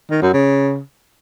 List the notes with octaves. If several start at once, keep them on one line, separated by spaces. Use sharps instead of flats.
D#3
F#2
C#3